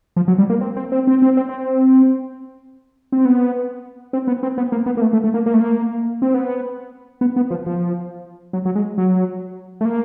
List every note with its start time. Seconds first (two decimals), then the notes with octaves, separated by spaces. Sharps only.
0.16 F3
0.28 F#3
0.38 G3
0.50 A#3
0.61 C4
0.76 C4
0.92 C4
1.07 C4
1.22 C4
1.37 C4
1.49 C4
3.12 C4
3.25 B3
4.13 C4
4.27 B3
4.43 C4
4.58 B3
4.72 A#3
4.86 B3
4.97 A#3
5.02 A3
5.13 A3
5.24 A3
5.34 A#3
5.46 A#3
5.54 A3
5.60 A#3
6.22 C4
6.34 B3
7.21 B3
7.36 B3
7.51 F3
7.66 F3
8.53 F#3
8.65 F#3
8.75 G#3
8.98 F#3
9.81 A3
9.85 A#3